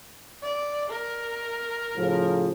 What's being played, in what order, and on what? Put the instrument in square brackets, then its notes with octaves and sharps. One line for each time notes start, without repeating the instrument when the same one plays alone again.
[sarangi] D5
A#4
[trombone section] A2 C#3 F3